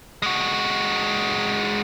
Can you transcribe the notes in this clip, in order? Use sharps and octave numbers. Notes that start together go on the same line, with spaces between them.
G#3 F#4